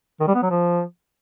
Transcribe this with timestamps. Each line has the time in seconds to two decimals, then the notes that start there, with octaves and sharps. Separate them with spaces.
0.20 D#3
0.27 G3
0.35 B3
0.43 F#3
0.50 F3